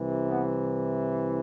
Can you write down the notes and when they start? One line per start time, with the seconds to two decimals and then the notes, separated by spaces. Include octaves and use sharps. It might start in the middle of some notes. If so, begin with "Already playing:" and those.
Already playing: C2 C3 E3
0.28 B3